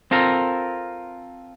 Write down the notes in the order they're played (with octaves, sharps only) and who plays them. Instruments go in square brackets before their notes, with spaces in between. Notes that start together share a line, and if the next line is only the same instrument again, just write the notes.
[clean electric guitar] C4 F4 A4 A#4